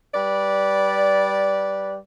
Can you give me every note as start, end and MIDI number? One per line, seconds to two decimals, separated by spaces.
0.15 1.96 55
0.15 1.96 71
0.15 1.96 74